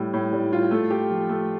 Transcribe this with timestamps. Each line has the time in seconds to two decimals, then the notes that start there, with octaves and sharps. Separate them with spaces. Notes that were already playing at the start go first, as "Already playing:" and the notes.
Already playing: A2 G3
0.14 A2
0.33 G3
0.53 F4
0.71 A3
0.91 G4
1.11 F3
1.29 A3